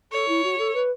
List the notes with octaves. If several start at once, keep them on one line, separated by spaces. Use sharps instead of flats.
A4 C#5
E4
F#4
A4
B4